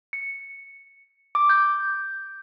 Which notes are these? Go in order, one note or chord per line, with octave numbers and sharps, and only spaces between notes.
C#7
D6
G6